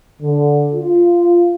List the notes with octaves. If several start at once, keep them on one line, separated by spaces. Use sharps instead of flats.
D3
F4